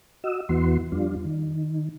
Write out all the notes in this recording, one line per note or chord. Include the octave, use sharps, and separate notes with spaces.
F#4 D#5 E6
E2 E3 B3 F#4 C6
F2 G3 D4 F4
D#3